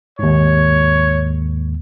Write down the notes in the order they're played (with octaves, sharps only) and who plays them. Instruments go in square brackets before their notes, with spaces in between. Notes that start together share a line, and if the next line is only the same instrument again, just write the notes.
[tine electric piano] D#2 G#2 [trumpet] C#5